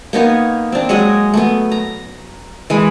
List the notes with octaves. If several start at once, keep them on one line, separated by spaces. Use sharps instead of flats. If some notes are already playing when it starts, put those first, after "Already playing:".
A#3 B3 D#4 C#5
C4 D4
F#3 G#3 C#5 D#5
A3 B3
A#5
E3 G#3 B5